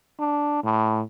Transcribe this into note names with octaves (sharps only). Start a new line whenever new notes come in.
D4
A2